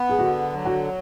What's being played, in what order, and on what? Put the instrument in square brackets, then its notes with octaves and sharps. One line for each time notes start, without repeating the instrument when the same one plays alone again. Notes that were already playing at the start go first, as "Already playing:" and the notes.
Already playing: [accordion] B3
[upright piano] G#4
[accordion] D3 [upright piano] F#4
[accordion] F#3
[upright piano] F#4